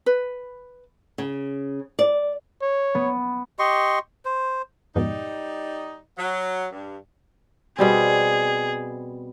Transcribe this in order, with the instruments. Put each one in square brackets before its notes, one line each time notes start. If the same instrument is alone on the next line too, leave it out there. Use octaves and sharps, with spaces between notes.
[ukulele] B4
[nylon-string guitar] C#3
D5
[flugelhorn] C#5
[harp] B3
[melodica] G4 D#5 C6 C#6
C5
[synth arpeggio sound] F2 G#2 B2 [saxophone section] G3 D#4
[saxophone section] F#3
G2
[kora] B2 G3 C4 [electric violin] G#4